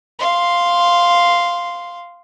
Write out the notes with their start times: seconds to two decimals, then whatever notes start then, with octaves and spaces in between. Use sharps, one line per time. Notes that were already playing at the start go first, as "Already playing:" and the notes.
0.19 F5 C6